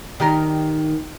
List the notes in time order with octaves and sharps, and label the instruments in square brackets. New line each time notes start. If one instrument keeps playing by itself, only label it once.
[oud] D#3 G4 A#4